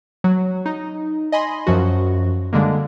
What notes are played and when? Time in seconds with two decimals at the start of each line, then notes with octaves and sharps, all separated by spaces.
0.24 F#3
0.66 D#4
1.32 D#5 G#5 B5 C6
1.67 F#2 F3 F#4
2.53 D3 G3 G#3 A#3